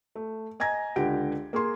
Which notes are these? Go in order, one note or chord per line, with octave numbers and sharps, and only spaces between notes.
A3
D#5 G#5 A#5 G#6 A#6
C#2 D3 G4 F#5 D7
A#3 G#4 C6